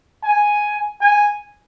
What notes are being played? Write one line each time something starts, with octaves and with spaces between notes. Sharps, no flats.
G#5
G#5